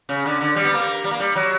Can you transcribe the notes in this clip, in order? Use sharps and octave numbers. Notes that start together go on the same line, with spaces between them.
C#3
D3
D3
G3
B3
A#3
G3
A#3
G3
F#3